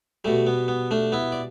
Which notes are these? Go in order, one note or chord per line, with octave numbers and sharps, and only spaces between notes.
B2 G3 A3
B3
B3
A3 D4
B3 E4
D5